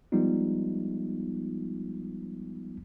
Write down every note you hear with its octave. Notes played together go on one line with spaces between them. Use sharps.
F3 G3 G#3 B3 D#4 F4